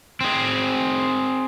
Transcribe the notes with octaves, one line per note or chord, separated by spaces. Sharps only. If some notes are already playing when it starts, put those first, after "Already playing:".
C4 G#4